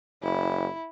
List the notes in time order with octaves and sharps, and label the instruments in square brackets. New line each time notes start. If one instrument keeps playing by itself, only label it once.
[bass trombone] F#1 [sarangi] E4